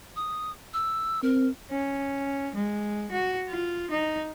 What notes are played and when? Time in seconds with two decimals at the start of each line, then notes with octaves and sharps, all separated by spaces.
0.16 D#6
0.73 E6
1.23 C4 A#4
1.71 C#4
2.55 G#3
3.11 F#4
3.49 F4
3.90 D#4